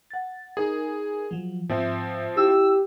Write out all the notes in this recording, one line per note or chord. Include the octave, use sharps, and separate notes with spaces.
F#5 A6
D#4 G#4 A#4 B5
F3 F#3
G#2 F3 C4 E5
E4 G4 E6